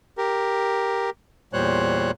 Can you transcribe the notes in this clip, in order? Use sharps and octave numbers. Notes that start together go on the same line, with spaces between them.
G4 A#4
E2 A#2 G3 C5 C#5 F#6